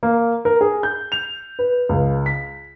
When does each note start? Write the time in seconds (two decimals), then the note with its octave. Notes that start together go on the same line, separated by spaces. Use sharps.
0.03 A#3
0.45 A#4
0.61 G#4
0.83 G6
1.12 F7
1.59 B4
1.89 C#2
2.26 B6